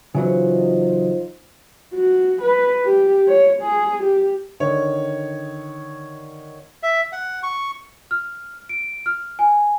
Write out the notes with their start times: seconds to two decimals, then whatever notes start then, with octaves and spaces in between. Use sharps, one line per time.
0.15 C#3 E3 F#3 D#4 F4 C5
1.94 F#4
2.42 B4
2.85 G4
3.28 C#5
3.61 G#4
4.03 G4
4.60 D3 D#3 C#5
6.83 E5
7.13 F#5
7.43 C#6
8.11 F6
8.69 D7
9.06 F6
9.39 G#5